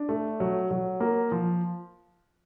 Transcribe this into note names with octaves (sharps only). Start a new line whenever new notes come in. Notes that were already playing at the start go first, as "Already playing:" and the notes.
Already playing: D4
A3
F#3
F#3
A#3
F3